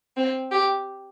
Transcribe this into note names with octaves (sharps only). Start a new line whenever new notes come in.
C4
G4